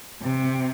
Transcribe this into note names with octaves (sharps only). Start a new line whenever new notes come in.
C3